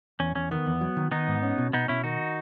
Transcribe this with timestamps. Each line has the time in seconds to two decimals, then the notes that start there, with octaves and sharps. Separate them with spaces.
0.20 E2 C#4
0.35 E2 C#4
0.51 D#3 B3
0.66 E2
0.81 F#3
0.97 D#3
1.11 D#3 B3 D#4
1.28 G#2
1.43 C#4
1.58 B2
1.73 B2 B3 D#4
1.88 B2 C#4 E4
2.04 D#3 D#4 F#4